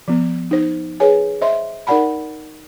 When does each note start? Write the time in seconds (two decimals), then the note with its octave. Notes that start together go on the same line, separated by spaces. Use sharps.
0.08 F3 B3
0.51 D#4 C5
1.00 G#4 B4 C#5 G#5
1.41 C5 D#5 E5 C6
1.87 D#4 A#4 D5 F#5 A5 B5